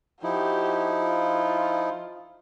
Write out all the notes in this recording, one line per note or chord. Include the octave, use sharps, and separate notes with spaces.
F3 D#4 E4 F#4 G4
F4